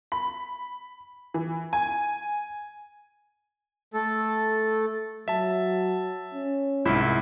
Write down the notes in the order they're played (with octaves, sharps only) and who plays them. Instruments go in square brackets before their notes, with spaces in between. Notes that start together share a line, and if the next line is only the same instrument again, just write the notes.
[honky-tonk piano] B5
E3
G#5
[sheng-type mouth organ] A3 A4
[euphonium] F#3 [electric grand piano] E5 A5
[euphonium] C#4
[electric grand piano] C2 G#2 [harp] E4